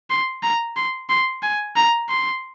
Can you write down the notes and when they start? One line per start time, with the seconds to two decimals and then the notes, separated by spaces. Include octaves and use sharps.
0.10 C6
0.43 A#5
0.76 C6
1.09 C6
1.43 G#5
1.76 A#5
2.09 C6